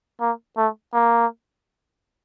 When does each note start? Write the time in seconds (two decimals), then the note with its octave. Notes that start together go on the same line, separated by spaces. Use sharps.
0.21 A#3
0.57 A3
0.94 A#3